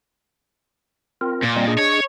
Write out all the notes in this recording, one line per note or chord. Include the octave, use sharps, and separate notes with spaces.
C4 F4 A#4
A#2
G3 C4 D#5
D4 G#4 D#5
C#5